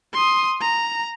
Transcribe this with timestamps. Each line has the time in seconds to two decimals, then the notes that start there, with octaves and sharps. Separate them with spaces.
0.14 C6 D#6
0.61 A#5